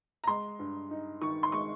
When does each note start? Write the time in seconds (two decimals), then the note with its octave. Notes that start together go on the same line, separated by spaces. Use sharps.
0.24 A#5
0.27 G#3 C6
0.59 G2
0.90 D#4
1.21 D#3 C#6
1.43 C6
1.52 G#3 C#6